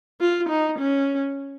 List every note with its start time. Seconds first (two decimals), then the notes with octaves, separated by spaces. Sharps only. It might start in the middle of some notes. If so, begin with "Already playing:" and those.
0.20 F4
0.49 D#4
0.78 C#4